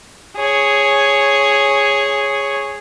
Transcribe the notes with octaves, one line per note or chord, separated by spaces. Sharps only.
G#4 C#5